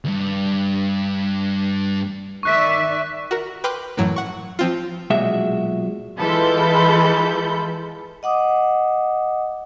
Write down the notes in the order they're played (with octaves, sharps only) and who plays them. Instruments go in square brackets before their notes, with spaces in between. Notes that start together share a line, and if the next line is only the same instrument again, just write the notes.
[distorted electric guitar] D2 G2
[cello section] D#3 D5 E5 [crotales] C#6 F#6 B6
[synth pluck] F#4 A#4
B4 G5 C6 D6 F6 F#6
F#2 A2 E3 F#3
F#5 C#6
F3 C4 F4
[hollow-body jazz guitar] B1 A#2 G#3 F#4 E5
[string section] E3 G#3 F4 A4 B5 G6
[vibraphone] D#5 F#5 D6 D#6